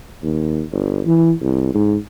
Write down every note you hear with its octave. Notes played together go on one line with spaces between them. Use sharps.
D#2
G1
E3
C2
G#2